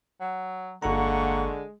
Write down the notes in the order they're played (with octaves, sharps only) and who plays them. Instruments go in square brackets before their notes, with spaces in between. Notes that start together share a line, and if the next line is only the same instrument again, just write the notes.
[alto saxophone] F#3
[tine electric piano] G1 A4 A#5 [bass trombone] D3 [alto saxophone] G#3 [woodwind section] A#3 F#5 C#6